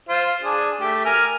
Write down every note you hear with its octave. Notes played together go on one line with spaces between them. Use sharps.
F4 C5
D4 G#4
A3 G4
A#4 G#5 F6